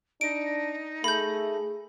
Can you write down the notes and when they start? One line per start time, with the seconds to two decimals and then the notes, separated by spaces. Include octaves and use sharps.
0.21 D4 D#4 D7
1.04 A3 G#4 B5 G6